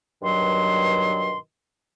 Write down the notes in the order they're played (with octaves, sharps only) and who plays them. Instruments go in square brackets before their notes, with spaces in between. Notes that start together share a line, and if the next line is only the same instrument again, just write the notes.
[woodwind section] G2 B2 D#3 F#3 C6